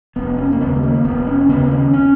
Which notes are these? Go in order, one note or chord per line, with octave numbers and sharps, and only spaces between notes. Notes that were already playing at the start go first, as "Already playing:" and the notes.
F1 B3
C#4
A#3
D#2 C#3 B3
G#3
A#3
F1 B3
C#4
D#2 C#3 B3
C#4
C#4